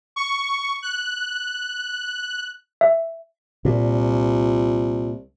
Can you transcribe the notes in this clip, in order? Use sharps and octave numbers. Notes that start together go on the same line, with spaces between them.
C#6
F#6
E5
C2 A#2